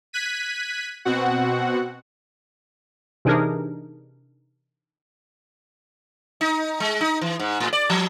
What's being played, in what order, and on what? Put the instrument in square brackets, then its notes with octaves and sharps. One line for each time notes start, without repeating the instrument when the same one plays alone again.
[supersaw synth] F#6 G#6 B6 D#7
B2 C4 F#4 F#5
[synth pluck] C3 E3 D4 D#4 G#4 A#4
[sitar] D#4
G#3
D#4
E3
G#2
A2
D5
F3